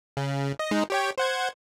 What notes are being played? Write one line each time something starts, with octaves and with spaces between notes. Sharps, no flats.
C#3
D#5
G#3 D#4
G4 C#5 G5
C5 F#5 G#6